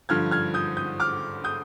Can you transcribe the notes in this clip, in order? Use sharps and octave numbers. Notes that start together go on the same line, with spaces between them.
G2 D3 F3 F6 G#6
F6 G#6
D#6 G6
D#6 G6
D6 F6
D#6 G6